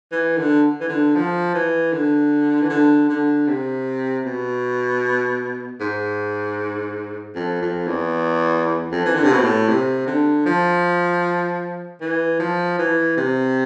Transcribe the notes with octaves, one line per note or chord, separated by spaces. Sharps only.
E3
D3
E3
D3
F3
E3
D3
E3
D3
D3
C3
B2
G#2
F2
F2
E2
F2
E3
D3
C3
B2
A2
C3
D3
F3
E3
F3
E3
C3